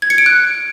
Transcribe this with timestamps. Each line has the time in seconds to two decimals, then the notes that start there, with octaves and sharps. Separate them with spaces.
0.02 G#6
0.10 C#7
0.18 D7
0.26 F#6